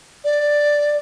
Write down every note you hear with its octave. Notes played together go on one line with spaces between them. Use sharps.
D5